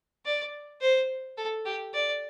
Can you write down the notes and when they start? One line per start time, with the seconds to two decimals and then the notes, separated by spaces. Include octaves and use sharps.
0.26 D5
0.81 C5
1.38 A4
1.66 G4
1.94 D5